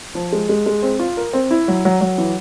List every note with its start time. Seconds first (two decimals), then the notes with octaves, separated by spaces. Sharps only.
0.15 F3
0.33 G#3
0.49 G#3
0.66 G#3
0.83 C4
0.99 F4
1.17 A#4
1.33 C4
1.51 E4
1.68 F#3
1.85 F#3
2.01 F#3
2.18 E3